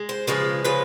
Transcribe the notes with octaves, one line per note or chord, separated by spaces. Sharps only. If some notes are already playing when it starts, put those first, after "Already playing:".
Already playing: G#3
C5
C#3 F3 G#3 B4
C#3 F3 G#3 B4